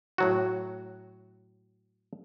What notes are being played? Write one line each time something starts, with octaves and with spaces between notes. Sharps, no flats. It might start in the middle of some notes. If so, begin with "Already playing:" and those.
A2 F#3 F#4